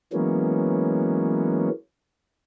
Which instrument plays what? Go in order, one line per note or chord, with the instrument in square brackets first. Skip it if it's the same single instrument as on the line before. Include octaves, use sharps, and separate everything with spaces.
[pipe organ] E3 F#3 G#3 A#3 B3 C#4